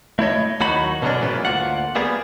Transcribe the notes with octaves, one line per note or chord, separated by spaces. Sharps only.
A3 E4 C#5 D#5
D#2 F#3 D#4 F#4 B5
B2 D3 F#3 G3 C#4 D4
G#2 E3 F#3 A#3 B3
D2 A#3 F4 F#5
G3 A#3 B3 G#4